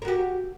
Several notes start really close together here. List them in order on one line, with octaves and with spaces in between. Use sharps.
A#4 F#4 G4